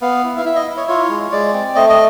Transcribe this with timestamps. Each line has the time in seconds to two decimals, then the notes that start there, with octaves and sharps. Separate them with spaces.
0.01 B3 F5
0.24 E4
0.37 F5
0.46 E4 E5
0.56 D#5
0.66 E4
0.77 C#5
0.88 F4 C#5
1.10 G#3
1.32 G#3 D5
1.53 C4
1.76 A3 D#5
1.89 D#5